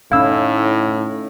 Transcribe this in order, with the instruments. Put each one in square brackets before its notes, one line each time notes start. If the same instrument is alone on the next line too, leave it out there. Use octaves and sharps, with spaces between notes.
[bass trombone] A2 [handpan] A3 C#4 D#4 [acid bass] E4 [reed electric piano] F5 E6